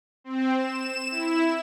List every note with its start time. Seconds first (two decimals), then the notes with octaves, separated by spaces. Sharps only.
0.24 C4
0.56 E7
1.11 E4